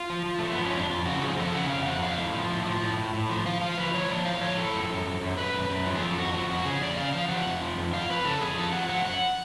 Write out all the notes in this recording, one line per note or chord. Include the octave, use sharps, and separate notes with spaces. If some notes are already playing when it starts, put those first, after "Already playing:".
Already playing: F4
F3
F3
F3 A3
B3
F3
C#4
F2 D4
F2 F4
C#3 F#4
F3 G#4
F3 A4
C#3 F#5
F2 F5
F2 F#5
C#3 F5
A2
F3
A2
F3
A2
A2
A2
F3
F3 F5
F3 F5
F3 B4
F3 C#5
F3 D5
A2 F5
F3 C#5
A2 A4
F#2
F#2
F#2
F#2
F#2 B4
F#2
F#2
F3
G#4
F2 A4
F2 F#4
F3 F#4
F2 F#4
C#3 G#4
F2 D5
C#3 F5
F3 F5
F3 F#5
F2
F3
F2
F2 F5
F2 B4
C#3 A4
F2 G#4
F3 A4
F3 F#5
F3 F#5
F#2 F#5